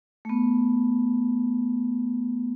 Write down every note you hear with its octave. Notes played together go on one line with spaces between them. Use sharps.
A3 B3